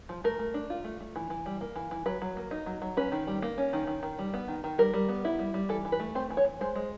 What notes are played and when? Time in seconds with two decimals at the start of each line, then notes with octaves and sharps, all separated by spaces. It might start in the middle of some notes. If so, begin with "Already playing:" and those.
0.09 F3
0.24 A3 A#4
0.39 A3
0.54 D4
0.70 F4
0.84 A3
1.00 A3
1.16 E3
1.30 E3
1.46 G3
1.61 A#3
1.76 E3
1.91 E3
2.06 F#3 B4
2.22 F#3
2.37 A#3
2.51 D#4
2.66 F#3
2.82 F#3
2.97 C#4 B4
3.12 D#3
3.27 G3
3.42 A#3
3.58 C#4
3.73 D#3
3.87 D#3
4.03 D#3
4.19 G3
4.34 B3
4.48 D#3
4.64 D#3
4.78 G3 A#4
4.94 G3
5.09 B3
5.25 E4
5.39 G3
5.54 G3
5.69 E3 A4
5.85 E3
5.92 B4
6.00 A3
6.15 C4 C5
6.30 E3
6.37 C#5
6.45 E3
6.61 G#3 C5
6.75 G#3